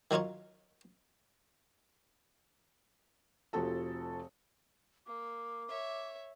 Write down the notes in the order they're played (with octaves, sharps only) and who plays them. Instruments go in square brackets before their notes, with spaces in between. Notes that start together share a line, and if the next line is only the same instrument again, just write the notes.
[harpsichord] D#3 F#3 D#4 F4 C#5
[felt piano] F1 F3 C4 F#4 A4 A5
[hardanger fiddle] A#3 [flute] D6
[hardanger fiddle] C#5 E5